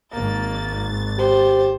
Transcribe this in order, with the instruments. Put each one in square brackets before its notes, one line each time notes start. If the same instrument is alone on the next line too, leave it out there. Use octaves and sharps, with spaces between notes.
[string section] G#1 A6 [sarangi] A#3
[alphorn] G4 [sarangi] C5